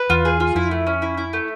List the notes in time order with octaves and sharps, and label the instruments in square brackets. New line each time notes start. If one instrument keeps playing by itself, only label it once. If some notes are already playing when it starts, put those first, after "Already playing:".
Already playing: [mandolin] B4
[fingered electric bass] E2 [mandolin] F4
[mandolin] G#4
F4
[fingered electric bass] F2 [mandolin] E4
[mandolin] A3
C#4
E4
E4
A3